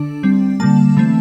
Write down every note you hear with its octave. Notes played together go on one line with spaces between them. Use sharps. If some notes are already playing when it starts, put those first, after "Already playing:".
Already playing: D3 D4
G3 C4
D3 G3 A#3 A5
E3 A3 C4